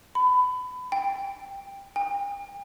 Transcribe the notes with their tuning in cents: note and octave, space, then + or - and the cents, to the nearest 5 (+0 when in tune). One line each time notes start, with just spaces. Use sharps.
B5 +25
G5 +15
G5 +40